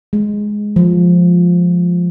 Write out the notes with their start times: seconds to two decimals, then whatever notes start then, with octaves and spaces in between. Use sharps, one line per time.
0.13 G#3
0.76 F3